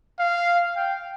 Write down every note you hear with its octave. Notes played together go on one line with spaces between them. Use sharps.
F5
G5